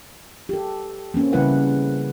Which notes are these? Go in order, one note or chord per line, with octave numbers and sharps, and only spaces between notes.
G4 A4
A#3 C4 C#4
C#3 G3 A3 E4 B4 F#5